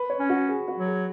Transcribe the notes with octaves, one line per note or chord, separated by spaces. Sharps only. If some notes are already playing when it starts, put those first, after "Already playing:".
Already playing: B4
C#5
C#4
F#4
G#4
F#4
F#3
G#4